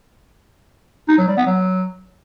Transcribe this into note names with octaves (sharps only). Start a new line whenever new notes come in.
D#4
F#3
G3
B3
F#3